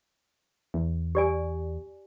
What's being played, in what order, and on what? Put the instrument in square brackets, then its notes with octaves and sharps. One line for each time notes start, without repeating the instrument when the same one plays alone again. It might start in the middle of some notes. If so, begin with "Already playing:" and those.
[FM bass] E2
[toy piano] G4 D5 G#5